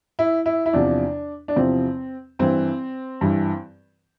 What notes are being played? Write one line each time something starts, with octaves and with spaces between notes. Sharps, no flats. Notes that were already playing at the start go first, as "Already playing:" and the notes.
E4
E4
E4
E2 C3 F3 D4
D4
E2 C3 F3 C4
G2 E3 C4
G2 E3